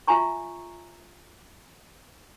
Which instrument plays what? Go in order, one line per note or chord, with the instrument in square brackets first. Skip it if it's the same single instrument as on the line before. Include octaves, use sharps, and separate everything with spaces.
[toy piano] F4 E5 G#5 A#5 C#6